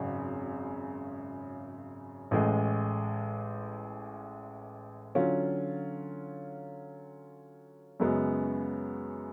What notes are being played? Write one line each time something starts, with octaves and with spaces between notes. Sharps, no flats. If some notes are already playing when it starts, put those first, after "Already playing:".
Already playing: G#1 F#2 C#3
A1 A2 G#3
D3 F#3 C#4 F4
F#2 C#3 G#3 B3 F#4